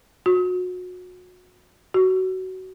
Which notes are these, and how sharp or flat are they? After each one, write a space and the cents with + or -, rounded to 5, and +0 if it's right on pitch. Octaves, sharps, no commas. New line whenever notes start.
F#4 -30
F#4 +20